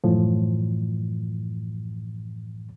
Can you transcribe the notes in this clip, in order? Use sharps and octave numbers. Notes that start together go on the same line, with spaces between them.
F#2 A2 E3 F3